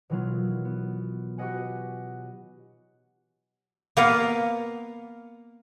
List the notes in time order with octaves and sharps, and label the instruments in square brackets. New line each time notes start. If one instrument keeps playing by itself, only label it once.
[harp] B2 D#3 E3 F#3 B3 F4
B3
F#4 G4 B4 D#5 F#5 G#5
[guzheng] A#3 B3 F5